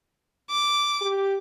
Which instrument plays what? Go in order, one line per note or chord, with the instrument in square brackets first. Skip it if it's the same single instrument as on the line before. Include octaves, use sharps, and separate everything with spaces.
[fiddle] D6
[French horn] G4